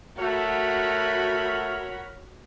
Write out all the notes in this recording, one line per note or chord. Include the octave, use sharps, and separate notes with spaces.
A3 F#4 A#4 C#5 F#5 B5